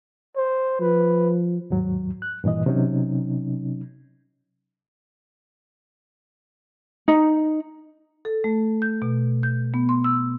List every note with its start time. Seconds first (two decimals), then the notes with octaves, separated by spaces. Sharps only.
0.36 C5
0.80 F3 B4
1.70 D#2 G#2 F#3
2.22 F#6
2.44 G2 A#2 E3 D#5
2.66 C3 F#3 C#4 D#4
7.08 D#4
8.25 A4
8.44 A3
8.82 G6
9.02 B2
9.43 G6
9.74 B3
9.89 C6
10.04 E6